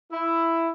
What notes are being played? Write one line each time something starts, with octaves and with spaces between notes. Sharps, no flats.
E4